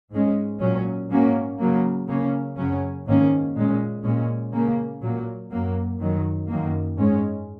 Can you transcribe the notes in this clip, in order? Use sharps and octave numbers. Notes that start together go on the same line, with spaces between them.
G#2 G#3 C#4
A#2 F#3 C#4
G#2 F#3 A#3 C#4
C#3 F#3 A#3
C#3 A#3 C#4
F#2 C#3 F#3 C#4
G#2 D#3 A#3 C#4
A#2 G#3 C#4
A#2 G#3 C#4
C#3 A#3 C#4
A#2 F#3 A#3
F#2 F#3 A#3
F#2 D#3 F#3
F#2 D#3 A#3
G#2 G#3 C#4